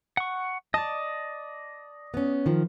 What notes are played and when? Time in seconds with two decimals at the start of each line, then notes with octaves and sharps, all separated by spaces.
0.17 F#5 C#6
0.74 D5 D#5 A5
2.14 B3 C#4
2.46 D#3 F3